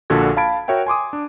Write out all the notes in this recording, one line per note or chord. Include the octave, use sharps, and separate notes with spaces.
A#1 A#2 D3 F#4 A4 G#6
F5 A5 B5 G#6 D7
F#4 A#4 C#5 E5 G5
G#5 C6 D6 D#6
D4